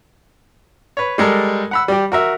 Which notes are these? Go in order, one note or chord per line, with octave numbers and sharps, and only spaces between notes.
B4 C#5
G3 G#3 A4 A#4
F#5 B5 E6
G3 G4
F#4 A#4 E5